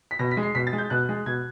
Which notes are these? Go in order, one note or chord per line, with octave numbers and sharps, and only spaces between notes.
B6
B2 A#6
B6
G#3
C7
B2 B6
A6
G#3
G6
B2 F#6
G#3
B2 G#6